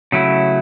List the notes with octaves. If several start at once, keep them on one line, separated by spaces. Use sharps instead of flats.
C#3 F#3 A3 E4